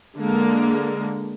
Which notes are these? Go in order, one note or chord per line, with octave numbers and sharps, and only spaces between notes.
D3 G#3 A#3